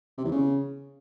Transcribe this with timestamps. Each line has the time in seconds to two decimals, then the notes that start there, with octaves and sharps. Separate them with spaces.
0.18 C3
0.24 E2
0.31 C#3